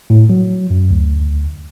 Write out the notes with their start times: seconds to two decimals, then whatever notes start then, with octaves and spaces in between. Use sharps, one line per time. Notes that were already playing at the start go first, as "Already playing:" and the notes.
0.10 A2
0.30 F#3
0.70 F#2
0.91 D2